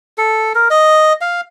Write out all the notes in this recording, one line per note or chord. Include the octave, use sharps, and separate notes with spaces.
A4
A#4
D#5
F5